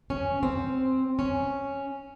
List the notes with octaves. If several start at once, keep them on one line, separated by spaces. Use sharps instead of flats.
C#4
C4
C#4